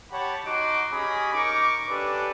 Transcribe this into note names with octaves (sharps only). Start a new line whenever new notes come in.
G4 C#5 F#5 A5 B5
D#4 F#4 D#5 C6 D6
C#4 G4 G#4 D#5 B5
D#4 A#4 C#6 D6
C#4 D4 G4 A4 B4